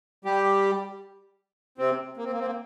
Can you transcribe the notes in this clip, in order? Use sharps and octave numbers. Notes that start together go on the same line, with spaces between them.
G3 G4
C3 C4
A#3
C4
A#3
C4
A#3